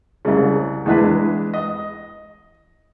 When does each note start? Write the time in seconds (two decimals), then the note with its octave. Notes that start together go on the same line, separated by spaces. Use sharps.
0.25 C2 C#3
0.86 E2 E3 G#3 D4 B4
1.54 D#5